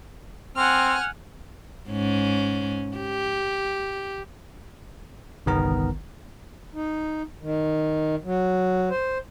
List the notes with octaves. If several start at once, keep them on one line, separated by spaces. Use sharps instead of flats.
C4 F#5 G#5 F6
G#2 C#4
G4
G1 C2 D#3 B3 A#4 A#5
D#4
D#3
F#3
C5